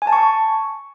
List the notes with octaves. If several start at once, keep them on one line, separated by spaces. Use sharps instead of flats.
G#5
A5
C#6